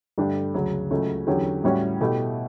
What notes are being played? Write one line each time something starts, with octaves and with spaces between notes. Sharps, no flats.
G2 D3 A3 D4 G4
D2 C#3 F#3
C#2 C#3 F#3 A3 C#4
E2 D3 F#3 C#4 G4
A2 G3 C#4 F#4
B2 A3 E4 G4